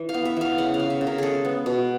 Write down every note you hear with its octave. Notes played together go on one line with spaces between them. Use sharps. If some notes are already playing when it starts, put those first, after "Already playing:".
Already playing: E3
F5
B3
E5
E3 F5
C#3 F#5
F5
C#3
E5
C#3
A#4
G#3 G#4 A4
B3
B2